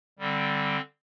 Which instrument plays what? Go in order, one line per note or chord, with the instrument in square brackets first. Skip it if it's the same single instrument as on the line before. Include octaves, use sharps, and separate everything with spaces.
[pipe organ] D3 G3 C4